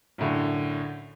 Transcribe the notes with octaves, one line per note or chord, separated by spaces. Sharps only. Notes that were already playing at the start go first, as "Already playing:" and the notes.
B1 F#2 A2 D3